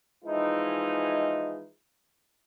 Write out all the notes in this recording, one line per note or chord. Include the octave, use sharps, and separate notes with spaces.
E3 F3 G#3 D#4 E4